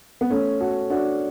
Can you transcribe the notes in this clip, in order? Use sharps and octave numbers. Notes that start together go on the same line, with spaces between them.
B3
A3 C#4
F#4 A4
D4 F#4